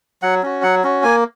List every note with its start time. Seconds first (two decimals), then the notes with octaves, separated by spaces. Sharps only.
0.22 F#3 F#5
0.43 C#4 F#4
0.63 F#3 F#5
0.84 C#4 F#4
1.03 A#3 G#5